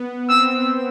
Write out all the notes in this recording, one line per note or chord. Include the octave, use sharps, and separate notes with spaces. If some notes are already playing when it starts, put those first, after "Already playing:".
Already playing: B3
C4 E6